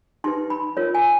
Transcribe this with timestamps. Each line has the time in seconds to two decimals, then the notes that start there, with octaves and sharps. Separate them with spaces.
0.24 D#4 G4 B4 C6
0.50 B5
0.77 F4 A#4 C#5
0.94 G#5